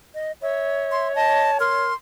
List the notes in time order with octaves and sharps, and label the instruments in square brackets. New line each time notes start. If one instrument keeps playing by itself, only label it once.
[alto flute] D#5
[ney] C#5 [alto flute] E5
[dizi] C6
[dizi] D#5 [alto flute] A5
[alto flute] A#4 [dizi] C6